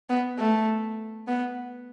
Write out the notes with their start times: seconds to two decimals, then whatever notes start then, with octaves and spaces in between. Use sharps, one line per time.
0.10 B3
0.39 A3
1.28 B3